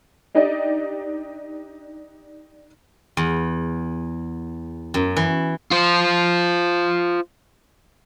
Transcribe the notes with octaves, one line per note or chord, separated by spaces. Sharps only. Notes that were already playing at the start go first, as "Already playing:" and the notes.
D4 D#4 G4 D5 D#5
E2
F#2
E3
F4 C5